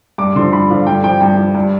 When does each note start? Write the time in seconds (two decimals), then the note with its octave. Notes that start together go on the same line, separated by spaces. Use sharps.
0.18 G2 D6
0.36 D3 F3 C6
0.52 G2 B5
0.70 D3 F3 F5
0.87 G2 G5
1.04 F3 G5
1.21 G2 G5
1.39 F3
1.55 G2